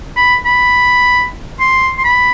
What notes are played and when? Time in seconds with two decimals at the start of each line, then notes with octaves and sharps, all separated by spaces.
0.16 B5
0.45 B5
1.60 C6
1.98 C6
2.04 B5